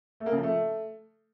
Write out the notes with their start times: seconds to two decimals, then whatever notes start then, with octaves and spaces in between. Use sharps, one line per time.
0.20 A3
0.26 A#3
0.32 C#3
0.37 F3
0.43 A3